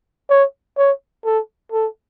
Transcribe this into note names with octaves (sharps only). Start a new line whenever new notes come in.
C#5
C#5
A4
A4